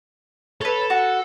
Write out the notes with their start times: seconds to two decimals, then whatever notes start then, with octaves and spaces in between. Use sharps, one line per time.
0.61 A4 B4 C#5
0.90 F#4